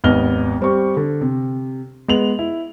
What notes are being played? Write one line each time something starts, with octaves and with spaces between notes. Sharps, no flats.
G#1 D#2 B3 D#5 F6 G7
G3 C4 G4 C#6
D3
C3
G#3 B3 F7 F#7
E4